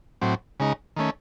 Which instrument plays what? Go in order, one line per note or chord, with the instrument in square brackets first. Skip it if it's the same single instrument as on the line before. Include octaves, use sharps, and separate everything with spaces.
[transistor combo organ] A2 F#3 C4
C#3 G#3 D#4
D#3 A3 C#4